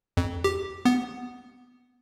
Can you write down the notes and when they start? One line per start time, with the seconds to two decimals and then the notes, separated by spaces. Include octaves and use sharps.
0.17 F2
0.44 G4
0.85 B3